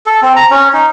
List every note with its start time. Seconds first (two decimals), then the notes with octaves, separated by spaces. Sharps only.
0.06 A4
0.22 C4
0.36 A#5
0.51 C#4
0.73 D#4